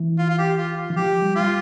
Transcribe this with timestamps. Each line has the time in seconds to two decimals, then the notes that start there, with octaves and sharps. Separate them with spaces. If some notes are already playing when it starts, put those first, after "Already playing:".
Already playing: E3
0.19 F4
0.29 F4
0.38 G4
0.58 F4
0.77 F4
0.90 E3
0.96 F3 G4
1.22 G3
1.35 G3 F4